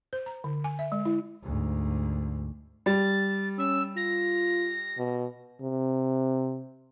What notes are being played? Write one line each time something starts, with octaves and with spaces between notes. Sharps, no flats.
C5
A#5
D3
G#5
E5
G#3
E4
D2 G#2
G3 A6
C#4 E6
F4 A#6
B2
C3